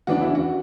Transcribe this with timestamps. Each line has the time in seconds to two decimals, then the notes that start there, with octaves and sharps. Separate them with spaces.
0.07 E2 C#3 E3 B3 D4 F#4
0.21 E4
0.35 F#4